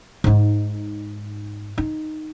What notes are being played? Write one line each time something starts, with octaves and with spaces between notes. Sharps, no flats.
G#2 D#4
D#4